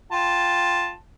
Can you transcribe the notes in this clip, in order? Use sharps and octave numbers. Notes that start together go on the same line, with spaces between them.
F4 G5 A5